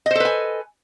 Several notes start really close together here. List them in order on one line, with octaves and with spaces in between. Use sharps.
D#5 C5 A4 B4 G#5